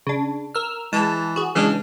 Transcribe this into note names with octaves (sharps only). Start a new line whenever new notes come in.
C#3 D4
A#4 E6 F6
E3 G#3 A5
F#4 G#4
C#3 E3 G#3 D4